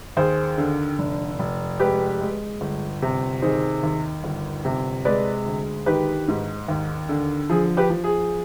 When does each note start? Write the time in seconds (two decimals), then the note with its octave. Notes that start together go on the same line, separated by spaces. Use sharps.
0.17 D#2 G#4 C5
0.58 D3
0.99 F1
1.39 F1
1.79 G#3 G4 B4
2.21 G#3
2.61 G1
3.02 C3
3.42 D#3 G#4 C5
3.83 D#2
4.24 G1
4.65 C3
5.05 G#3 B4 D5
5.46 D2
5.86 D#3 G4 B4
6.28 G#2
6.68 D#2
7.09 D3
7.49 F3 G#4
7.77 G4 B4
7.90 F3
8.04 G#4